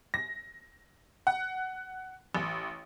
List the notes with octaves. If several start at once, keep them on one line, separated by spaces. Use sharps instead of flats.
A#6
F#5
A1